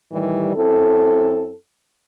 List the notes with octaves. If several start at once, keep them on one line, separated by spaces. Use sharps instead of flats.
A2 D#3 E3 G3
F#2 C4 E4 A4